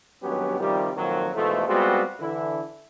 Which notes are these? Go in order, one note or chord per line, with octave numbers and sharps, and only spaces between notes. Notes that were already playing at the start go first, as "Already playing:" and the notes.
G#1 G2 F#3 B3 C#4 G4
C3 D#3 F3 G3
F2 A#2 D#3 F3 F#3
G#2 B2 E3 F3 A3
G3 G#3 B3 C4 F4 F#4
D3 E3 E4